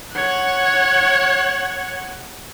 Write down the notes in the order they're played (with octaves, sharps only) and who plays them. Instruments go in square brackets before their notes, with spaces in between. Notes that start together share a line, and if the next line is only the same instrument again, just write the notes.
[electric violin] C#5 F#5